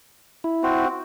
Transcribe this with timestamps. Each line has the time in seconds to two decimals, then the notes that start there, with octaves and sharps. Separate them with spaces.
0.44 E4
0.63 C4 F#4